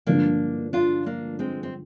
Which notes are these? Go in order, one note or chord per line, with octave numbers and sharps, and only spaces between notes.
G2 D3 F3 G#3 A#3 D4
D4 F4
A#3 D4
G#3 C4
C4